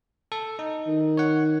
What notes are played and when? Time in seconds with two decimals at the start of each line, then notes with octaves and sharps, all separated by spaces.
0.32 A4
0.59 D#4
0.87 D#3
1.17 C#5 F#5